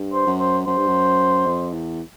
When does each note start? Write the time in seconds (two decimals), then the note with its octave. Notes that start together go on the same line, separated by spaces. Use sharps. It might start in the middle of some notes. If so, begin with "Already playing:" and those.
Already playing: G2
0.13 C5
0.27 F#2
0.40 C5
0.67 F#2 C5
0.78 G2
0.88 F#2
1.47 F2
1.73 E2